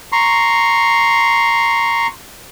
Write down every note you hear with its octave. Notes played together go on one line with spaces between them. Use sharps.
A#5 C6 C#6